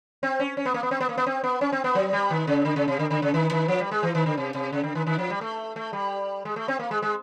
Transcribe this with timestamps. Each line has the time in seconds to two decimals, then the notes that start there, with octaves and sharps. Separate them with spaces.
0.23 C4
0.40 C#4
0.57 C#4
0.65 B3
0.74 A#3
0.83 B3
0.91 C4
1.00 B3
1.09 A#3
1.17 B3
1.26 C4
1.43 B3
1.61 C#4
1.72 C4
1.84 B3
1.95 F#3
2.13 G3
2.30 D#3
2.47 C#3
2.65 D3
2.76 C#3
2.88 C3
2.99 D3
3.10 D3
3.22 C#3
3.34 D#3
3.51 D#3
3.68 F3
3.80 G3
3.91 G#3
4.03 E3
4.15 D#3
4.26 D3
4.37 C3
4.55 C3
4.72 C#3
4.83 D3
4.95 D#3
5.07 D#3
5.18 F3
5.30 G3
5.41 A3
5.76 A3
5.93 G3
6.45 G#3
6.56 A3
6.68 C4
6.79 A#3
6.91 G#3
7.02 G#3